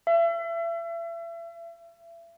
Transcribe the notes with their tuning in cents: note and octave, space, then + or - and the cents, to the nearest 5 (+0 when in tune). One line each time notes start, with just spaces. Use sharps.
E5 +35